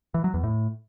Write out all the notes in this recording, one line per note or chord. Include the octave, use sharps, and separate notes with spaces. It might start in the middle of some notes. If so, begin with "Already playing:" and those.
E3
F#3
E2
A2